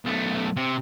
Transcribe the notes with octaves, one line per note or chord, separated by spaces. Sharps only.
B1 A3
C3